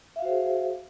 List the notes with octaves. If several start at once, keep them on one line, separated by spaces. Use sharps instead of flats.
F#4 G#4 C5 E5 F5